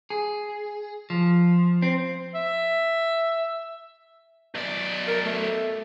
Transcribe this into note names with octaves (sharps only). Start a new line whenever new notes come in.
G#4
F3
C4
E5
B1 D5
A#4
A3